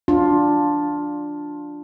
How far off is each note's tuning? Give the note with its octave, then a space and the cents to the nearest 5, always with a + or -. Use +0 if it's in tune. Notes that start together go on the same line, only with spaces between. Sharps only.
D4 +0 F4 +15